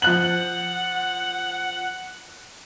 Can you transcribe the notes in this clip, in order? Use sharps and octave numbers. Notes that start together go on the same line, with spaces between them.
F3 F#5 F#6 F#7